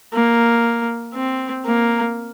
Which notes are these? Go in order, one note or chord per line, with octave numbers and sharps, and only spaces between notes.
A#3
C4
A#3